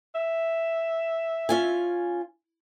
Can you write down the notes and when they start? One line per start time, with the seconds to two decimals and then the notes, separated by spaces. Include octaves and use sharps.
0.15 E5
1.49 C#4 F4 G#5